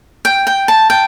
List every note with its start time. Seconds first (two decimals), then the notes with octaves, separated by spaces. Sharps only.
0.25 G5
0.47 G5
0.68 A5
0.90 G5